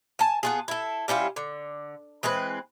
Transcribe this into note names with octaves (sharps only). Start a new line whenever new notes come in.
G#5 A5
B3 F4 G#4
E4 A4
G3 C#4 E4 F4
D3
E3 G#3 C4 B4